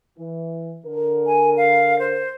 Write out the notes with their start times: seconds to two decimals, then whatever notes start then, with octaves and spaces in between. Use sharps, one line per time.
0.18 E3
0.86 D3 A#4
1.27 G#5
1.57 F5
1.99 C5